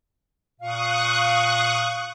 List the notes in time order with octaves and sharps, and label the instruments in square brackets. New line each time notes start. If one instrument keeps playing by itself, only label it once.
[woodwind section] A#2 F5 [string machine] C#6 D#6 F#6